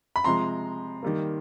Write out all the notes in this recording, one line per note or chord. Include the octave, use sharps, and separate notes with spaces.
B5
C3 F3 G#3 A#5 C6
D#3 G3 A#3